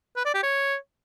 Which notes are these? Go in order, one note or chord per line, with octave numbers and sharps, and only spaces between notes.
B4
D5
G4
C#5